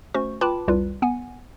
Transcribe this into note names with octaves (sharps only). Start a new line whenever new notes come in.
A3 C#4 F#4 C5 C#6
F4 B4 G5 A5 B5 D6
C2 F2 G3 F4 B4
B3 F#5 G#5